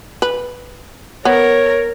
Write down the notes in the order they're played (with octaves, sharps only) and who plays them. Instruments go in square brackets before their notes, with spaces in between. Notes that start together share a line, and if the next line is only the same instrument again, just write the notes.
[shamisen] B4
[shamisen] B3 [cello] A#4 [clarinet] C#5